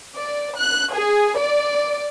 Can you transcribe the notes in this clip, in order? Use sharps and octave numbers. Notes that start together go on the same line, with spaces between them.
D5
F#6
G#4
D5